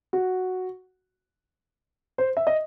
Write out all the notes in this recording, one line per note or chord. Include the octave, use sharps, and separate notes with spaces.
F#4
C5
E5
D#5